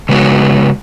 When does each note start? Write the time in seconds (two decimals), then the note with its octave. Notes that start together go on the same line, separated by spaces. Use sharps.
0.09 C#3 G#3 B3 F#4